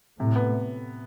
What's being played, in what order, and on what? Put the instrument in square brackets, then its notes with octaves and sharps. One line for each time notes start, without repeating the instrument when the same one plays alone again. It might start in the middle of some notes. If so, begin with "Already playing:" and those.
[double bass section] A2 [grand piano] C3
[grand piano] B3